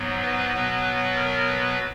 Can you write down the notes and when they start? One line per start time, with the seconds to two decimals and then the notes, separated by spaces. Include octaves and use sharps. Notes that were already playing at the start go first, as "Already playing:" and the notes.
Already playing: G#2 F#3 B3
0.22 B4
0.54 B2 F#3 B3
1.16 A#4
1.48 B4